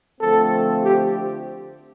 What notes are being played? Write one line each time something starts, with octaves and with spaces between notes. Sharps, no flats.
D3 F3 A3 C4 A4
G4